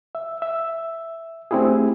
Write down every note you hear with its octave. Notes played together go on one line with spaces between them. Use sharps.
E5
E5
A3 C4 D4 E4 G4 G#4